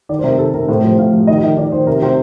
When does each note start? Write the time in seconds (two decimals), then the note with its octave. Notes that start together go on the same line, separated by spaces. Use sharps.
0.09 D#3 D5
0.19 C5
0.24 C3 A#4
0.39 D#3 A4
0.54 C3 A#4
0.68 A2 C5
0.84 F3 C5
0.98 A2 F5
1.13 F3
1.27 D#3 D#5
1.38 D#5
1.43 D#3
1.57 D#3 D5
1.72 D#3 C5
1.87 C3 A#4
2.02 C3 C5